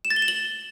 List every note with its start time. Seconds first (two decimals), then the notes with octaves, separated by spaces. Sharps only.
0.05 E7
0.10 A6
0.16 G7
0.22 E7
0.28 F#7